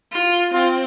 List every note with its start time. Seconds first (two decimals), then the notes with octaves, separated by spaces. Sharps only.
0.12 F4
0.54 C4 F4